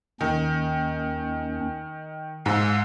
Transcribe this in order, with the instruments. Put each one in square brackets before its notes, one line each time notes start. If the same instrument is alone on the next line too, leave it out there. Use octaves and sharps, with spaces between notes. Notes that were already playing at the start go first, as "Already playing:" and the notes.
[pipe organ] D#2 C#4 [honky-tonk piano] D#3
[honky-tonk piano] G#2 [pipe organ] F5 G#5 E6